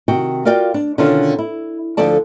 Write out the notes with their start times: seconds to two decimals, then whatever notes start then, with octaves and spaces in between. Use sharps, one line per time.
0.08 C3 D#3 F#4 G5
0.45 F4 F#4 A#4 D5 F5 G5
0.74 D4
0.98 B2 D3 D#3 C#4 D4 F4
1.39 E4
1.97 D2 D3 F3 A4 D5 A5